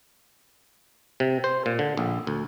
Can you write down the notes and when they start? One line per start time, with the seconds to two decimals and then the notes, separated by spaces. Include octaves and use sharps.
1.20 C3
1.44 C5
1.66 A#2
1.79 D3
1.97 A#1
2.27 D2